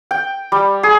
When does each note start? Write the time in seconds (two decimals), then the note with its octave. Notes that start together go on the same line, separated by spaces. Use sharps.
0.11 G5
0.52 G3
0.83 G#4